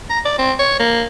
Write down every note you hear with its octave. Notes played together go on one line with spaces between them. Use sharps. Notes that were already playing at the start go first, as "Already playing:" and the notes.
A#5
D5
C4
C#5
A#3